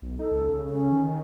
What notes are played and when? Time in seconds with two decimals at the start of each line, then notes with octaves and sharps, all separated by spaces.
0.02 B1
0.19 D#4 A4
0.31 C#2
0.50 C#3
0.69 C#4
0.92 D#3